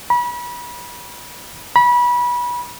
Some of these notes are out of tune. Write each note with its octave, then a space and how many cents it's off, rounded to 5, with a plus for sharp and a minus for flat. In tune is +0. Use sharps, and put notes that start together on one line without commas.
B5 -30
B5 -25